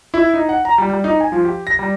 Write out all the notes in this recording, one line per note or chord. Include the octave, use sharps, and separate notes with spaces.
E4
D#4
F#5
A#5
G3
G3
D#4
G#5
F3
G4
A#6
G3